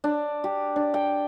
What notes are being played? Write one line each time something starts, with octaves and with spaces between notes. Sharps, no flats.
D4
G4
D4
G5